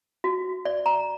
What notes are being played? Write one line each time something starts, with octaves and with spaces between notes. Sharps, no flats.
F#4
D5
A#5